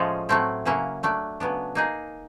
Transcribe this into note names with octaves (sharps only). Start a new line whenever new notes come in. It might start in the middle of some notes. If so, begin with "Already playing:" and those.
Already playing: A2 F3 G#3 C#4 F4
A2 F#3 A3 C4 E4
C#3 F#3 A#3 C#4 E4
F#3 A3 D4
C#3 F#3 B3 D4
A#3 D#4 G#4